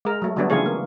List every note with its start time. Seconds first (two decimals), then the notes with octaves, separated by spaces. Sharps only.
0.05 G#3 A#4
0.22 F#3 A3
0.36 D3 F#3 G3 A3 B3 D4
0.50 C#3 E3 A3 F4 G#4 C#5
0.66 A#3